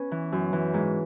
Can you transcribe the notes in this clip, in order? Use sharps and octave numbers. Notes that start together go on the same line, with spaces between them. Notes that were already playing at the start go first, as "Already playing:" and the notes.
Already playing: B3 C#4
E3
F#2
E3
G#2